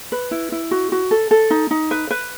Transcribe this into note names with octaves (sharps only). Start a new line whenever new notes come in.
B4
E4
E4
F#4
F#4
A4
A4
D#4
D#4
B4
B4